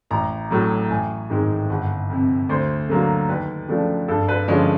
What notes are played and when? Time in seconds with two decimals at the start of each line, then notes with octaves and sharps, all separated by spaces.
0.11 A1 A#5
0.51 A2 F#3
0.90 A1 G#5
1.30 G#2 D#3 G#3 C4
1.70 G1 F#5
2.10 F2 C3
2.49 D2 C5
2.89 D3 F#3 A#3
3.29 D#2 B4
3.69 C#3 F3 A3 D4
4.08 G2 A4
4.28 B4
4.48 D3 F3 G#3 C#4 C#5